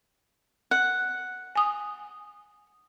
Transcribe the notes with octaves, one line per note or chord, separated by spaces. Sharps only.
F#5
G#5 D#6